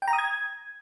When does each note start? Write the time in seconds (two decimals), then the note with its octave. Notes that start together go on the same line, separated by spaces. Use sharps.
0.02 G5
0.08 A#5
0.13 D#6
0.18 G#6